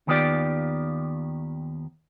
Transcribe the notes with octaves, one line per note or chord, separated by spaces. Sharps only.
D#2 D#3 B3 F4 G4 D5